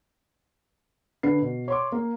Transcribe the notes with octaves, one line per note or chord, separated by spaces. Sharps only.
D3 B4 C7
B2
C#5 C6 D6
A#3